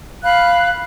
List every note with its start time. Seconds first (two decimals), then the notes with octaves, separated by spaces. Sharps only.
0.23 F5 B5 F#6